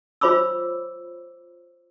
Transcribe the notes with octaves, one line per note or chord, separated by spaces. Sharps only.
F4 C5 C#5 B5 D6 E6